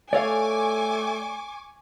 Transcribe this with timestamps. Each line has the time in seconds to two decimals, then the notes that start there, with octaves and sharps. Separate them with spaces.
0.13 A3 A4 C#5 D5 F5 G#5 C#6 D6